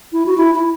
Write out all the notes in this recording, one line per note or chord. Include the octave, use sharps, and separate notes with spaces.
E4
F#4
E4
E4